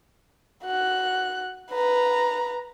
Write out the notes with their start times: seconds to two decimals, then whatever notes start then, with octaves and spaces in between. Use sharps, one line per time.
0.64 F#4 F#6
1.71 B4 A#5